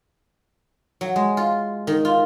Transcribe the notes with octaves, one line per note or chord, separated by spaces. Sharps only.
F#3
G#3
F4
D#3
F4